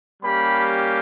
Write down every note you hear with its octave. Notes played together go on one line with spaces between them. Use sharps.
G3 A#3 C#4 G4 B5